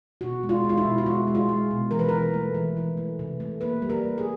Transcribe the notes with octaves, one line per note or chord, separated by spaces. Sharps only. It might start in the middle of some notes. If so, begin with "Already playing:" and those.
B2 F#4
G#3
F4
G#3 F4
E4
B2
F#4
G#3 F4
G#3
F4
G#3
B2
E3 A#4
B4
E3 A#4
A3
E3
E3
A3
C3
A3
A#3 B4
G3
A#4
G3
G#4